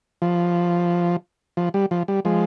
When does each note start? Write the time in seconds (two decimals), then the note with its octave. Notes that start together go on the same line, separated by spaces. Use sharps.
0.22 F3
1.57 F3
1.74 G3
1.91 F3
2.08 G3
2.25 F3 G#3